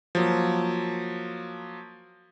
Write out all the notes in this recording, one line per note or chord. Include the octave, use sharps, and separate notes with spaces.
F3 F#3 A#3